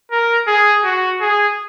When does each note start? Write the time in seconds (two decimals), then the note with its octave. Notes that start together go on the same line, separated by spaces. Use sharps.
0.11 A#4
0.48 G#4
0.84 F#4
1.21 G#4